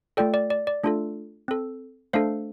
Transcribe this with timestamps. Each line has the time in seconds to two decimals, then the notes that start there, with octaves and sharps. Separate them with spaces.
0.17 A3 F4 A4 D5 G5
0.34 D5
0.50 D5
0.67 D5
0.84 A3 D4 F4 A4
1.48 C4 A4
2.13 A3 D4 A4 C5 F5